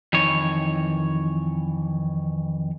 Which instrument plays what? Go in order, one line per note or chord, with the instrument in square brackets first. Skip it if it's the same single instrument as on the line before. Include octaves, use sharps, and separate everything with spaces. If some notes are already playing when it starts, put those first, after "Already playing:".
[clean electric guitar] F2 D#3 E3 C#5